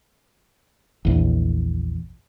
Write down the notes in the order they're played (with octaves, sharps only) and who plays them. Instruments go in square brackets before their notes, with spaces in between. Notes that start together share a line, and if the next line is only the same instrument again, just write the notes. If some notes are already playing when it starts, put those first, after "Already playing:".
[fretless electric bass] A#1 E2